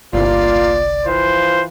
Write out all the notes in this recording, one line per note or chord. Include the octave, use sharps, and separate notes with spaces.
G1 C2 A#3 F4 D5
E3 F4 C5 F5